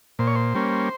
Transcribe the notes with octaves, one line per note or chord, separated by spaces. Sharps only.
A#2 C5
C#5
C5
G3 A#3 C#4